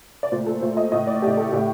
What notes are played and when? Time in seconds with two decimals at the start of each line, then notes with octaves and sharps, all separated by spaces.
0.23 D5
0.32 A#2 A3 C5
0.46 A4
0.61 A#2 A3 C5
0.77 D#5
0.92 A2 A3 D#5
1.07 D5
1.22 A2 A3 G4
1.37 A4
1.52 A2 A3 G4